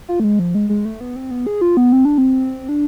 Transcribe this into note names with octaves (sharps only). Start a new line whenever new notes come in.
F4
A3
G#3
F3
G#3
G#3
A3
B3
C4
B3
G#4
F4
B3
C4
D4
C4
D4